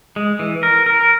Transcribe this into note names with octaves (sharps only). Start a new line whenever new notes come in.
G#3
E3
A#4
A#4